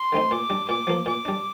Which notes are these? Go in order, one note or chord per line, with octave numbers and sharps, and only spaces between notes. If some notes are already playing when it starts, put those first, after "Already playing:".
Already playing: C6
D3 A3 C4 D#4
A#2 D6
G3 D4
A#2 D6
F3 A#3
A#2 D6
G3 D4